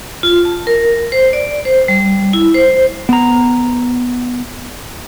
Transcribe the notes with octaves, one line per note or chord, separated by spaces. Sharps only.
F4
A5
A#4
C5
D5
C5
G3
E4
C5
B3 A#5